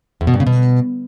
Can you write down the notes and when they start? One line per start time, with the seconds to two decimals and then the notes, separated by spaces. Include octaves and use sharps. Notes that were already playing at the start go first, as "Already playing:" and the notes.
0.21 E2
0.27 B2
0.34 G2
0.40 C#3
0.47 B2